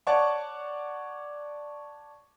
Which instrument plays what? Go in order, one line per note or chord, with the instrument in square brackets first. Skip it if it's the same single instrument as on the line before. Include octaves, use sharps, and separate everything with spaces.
[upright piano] C#5 D5 F#5 A5 C#6 D6